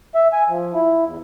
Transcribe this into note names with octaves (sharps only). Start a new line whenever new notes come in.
E5
G#5
F3
E4
E2